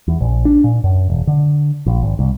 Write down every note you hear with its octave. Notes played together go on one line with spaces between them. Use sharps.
E2
A#1
D4
A#2
F#2
E1
D3
A#1
G#1
C2